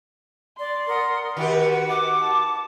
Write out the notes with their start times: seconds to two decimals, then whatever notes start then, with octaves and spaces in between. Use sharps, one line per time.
0.58 D5 C6
0.88 A#4 F#5 D#6
1.37 D#3 F#4 G4 B4 F#5
1.90 D6
2.22 A5